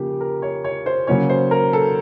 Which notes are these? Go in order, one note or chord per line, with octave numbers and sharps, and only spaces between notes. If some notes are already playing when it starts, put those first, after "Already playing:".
Already playing: C#3 F3 A#3 G4
A#4
C#5
C#5
C5
C#3 F#3 A#3 C#4 C#5
C5
A#4
A4